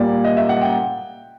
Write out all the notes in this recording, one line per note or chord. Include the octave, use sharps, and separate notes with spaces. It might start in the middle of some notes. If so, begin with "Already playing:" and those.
Already playing: A#2 G3 A#3 D5
D#5
E5
F#5
G5